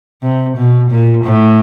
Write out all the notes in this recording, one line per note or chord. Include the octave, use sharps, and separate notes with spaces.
C3
B2
A#2
A2